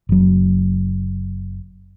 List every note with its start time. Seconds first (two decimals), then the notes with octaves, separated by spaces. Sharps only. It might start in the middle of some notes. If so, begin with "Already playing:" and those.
0.09 F#1 F#3